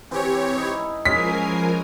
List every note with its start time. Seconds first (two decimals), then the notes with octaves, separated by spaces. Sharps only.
0.11 E3 C4 G4 C#5
0.58 D#4 E4
1.05 F3 G#3 C#4 A#4 G#5 B6 C7